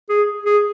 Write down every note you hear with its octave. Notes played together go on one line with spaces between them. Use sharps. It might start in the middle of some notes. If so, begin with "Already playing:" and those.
G#4
G#4